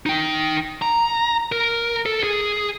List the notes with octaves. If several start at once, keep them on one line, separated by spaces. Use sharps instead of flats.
D#4 G5
A#5
A#4
A4
G#4